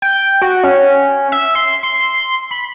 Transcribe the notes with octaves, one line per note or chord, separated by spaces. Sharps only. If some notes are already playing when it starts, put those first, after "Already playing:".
G5
F#4
C#4
E5
C6
C6
B5